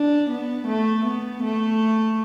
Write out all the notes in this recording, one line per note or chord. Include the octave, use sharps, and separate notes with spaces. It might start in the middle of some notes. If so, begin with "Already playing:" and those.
Already playing: D4
B3
A3
B3
A3